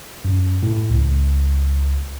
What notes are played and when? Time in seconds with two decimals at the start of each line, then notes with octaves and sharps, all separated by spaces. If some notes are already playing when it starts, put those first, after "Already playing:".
0.25 F#2
0.63 A2
0.90 C#2